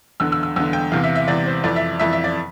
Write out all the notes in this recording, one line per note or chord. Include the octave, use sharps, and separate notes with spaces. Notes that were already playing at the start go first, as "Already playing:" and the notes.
E2 D3 E6
E6
E6
E2 D3 E6
G5
E2 C3 E3 F5
E5
E5
E2 C3 E3 D5
C5
F2 E3 D5
E5
F2 E3 E5
E5
D5